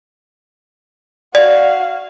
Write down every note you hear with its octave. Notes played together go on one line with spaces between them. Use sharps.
F#4 D5 F5